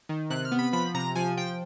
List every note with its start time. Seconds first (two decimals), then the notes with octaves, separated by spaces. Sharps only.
0.09 D#3
0.30 C3 F#6
0.45 F6
0.52 B3
0.59 B5
0.73 F3 B5
0.94 C3 A#5
1.15 F3 G#5
1.37 F3 G5